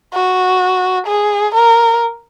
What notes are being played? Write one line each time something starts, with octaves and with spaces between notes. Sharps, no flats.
F#4
G#4
A#4